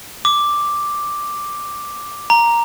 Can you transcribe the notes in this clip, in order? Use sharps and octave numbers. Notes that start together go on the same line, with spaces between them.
D6
A#5